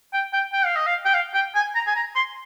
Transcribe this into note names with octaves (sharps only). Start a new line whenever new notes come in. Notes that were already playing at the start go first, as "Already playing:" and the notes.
G5
G5
G5
F5
D#5
F5
G5
F5
G5
G#5
A#5
G#5
A#5
C6